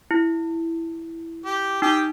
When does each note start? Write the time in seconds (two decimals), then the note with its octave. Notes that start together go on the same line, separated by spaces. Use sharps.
0.11 E4
1.45 G4
1.82 D#4 G4 G5 D#6